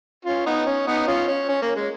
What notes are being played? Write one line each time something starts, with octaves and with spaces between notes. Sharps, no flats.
C#4 F4
B3 D#4
C#4
B3 D#4
C#4 F4
C#4
C#4
A#3
G#3